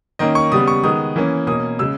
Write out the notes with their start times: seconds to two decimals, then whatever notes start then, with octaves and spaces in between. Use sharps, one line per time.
0.19 D#3 A#3 C#4 D#5
0.35 C#6
0.52 C#3 G3 B3 D#6
0.68 C#6
0.84 D#3 G#3 B3 D#6
1.16 E3 A#3 C#4
1.47 B2 A#3 C#4 D#6
1.79 C#3 G#3 E6